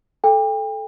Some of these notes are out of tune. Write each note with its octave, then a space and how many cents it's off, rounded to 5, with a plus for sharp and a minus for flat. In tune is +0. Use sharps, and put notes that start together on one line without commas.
A4 -15 G5 +35